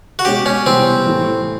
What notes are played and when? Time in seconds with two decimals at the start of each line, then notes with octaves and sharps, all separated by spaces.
0.19 F#4
0.25 B2 G#3 C#4 G4
0.46 C#4
0.66 C3 E3 G3 B3 C4
1.06 A2 E3 A3